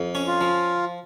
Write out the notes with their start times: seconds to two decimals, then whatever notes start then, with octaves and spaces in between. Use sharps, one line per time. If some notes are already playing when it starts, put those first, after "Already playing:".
Already playing: F2
0.15 C#4
0.27 F4
0.41 F3